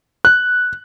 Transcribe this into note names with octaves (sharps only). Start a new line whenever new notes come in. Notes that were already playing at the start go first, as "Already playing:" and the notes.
F#6